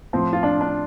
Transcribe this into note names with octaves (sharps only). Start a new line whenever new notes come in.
A2 F3 C4
F4
D4
D4